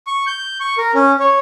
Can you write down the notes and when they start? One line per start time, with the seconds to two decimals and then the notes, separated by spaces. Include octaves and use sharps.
0.07 C#6
0.27 G6
0.60 C#6
0.78 A#4
0.95 C#4
1.20 C#5